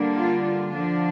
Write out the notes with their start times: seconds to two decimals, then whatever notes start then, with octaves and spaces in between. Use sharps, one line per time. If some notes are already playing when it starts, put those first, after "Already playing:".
Already playing: D3 G3 A#3 D4
0.14 F4
0.43 F4
0.73 D3 F3 D4